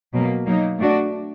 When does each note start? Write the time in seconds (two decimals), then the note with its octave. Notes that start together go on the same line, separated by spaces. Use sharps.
0.13 B2 F#3 A#3
0.46 F#3 A#3 D#4
0.79 A3 D4 F#4